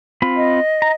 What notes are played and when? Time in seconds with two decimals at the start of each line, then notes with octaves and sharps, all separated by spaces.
0.22 C4 F4 B5
0.36 D#5
0.82 A#5